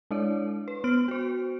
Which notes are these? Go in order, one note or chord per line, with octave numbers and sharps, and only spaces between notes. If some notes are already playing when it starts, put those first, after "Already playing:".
G#3 D4 E4 C#5 D5
B4
B3 F6 D7
F#4 C5